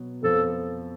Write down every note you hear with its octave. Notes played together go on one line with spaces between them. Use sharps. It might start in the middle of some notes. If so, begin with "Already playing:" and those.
Already playing: B2 F#3 B3
F2 F3 B3 A4